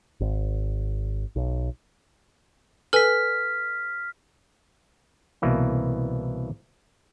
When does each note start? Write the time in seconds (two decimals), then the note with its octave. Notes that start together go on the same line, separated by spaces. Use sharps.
0.20 G#1
1.36 B1
2.93 A4 B4 G#5 F6 B6
5.42 C2 B2 E3 A#3